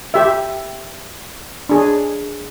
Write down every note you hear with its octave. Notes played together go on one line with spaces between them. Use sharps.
G4 E5
D4 G#4